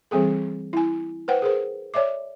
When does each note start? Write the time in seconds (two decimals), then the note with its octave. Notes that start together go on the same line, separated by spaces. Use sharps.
0.11 E3 G3 C4 G#4 A4
0.73 E4 G#5
1.28 B4 C5 F#5 G5
1.42 G#4 A#4 C5
1.94 C#5 D5 E5 D6